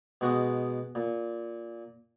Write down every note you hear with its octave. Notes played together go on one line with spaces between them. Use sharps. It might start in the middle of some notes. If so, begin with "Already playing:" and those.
B2 G#3 F#4 G5 D#6
A#2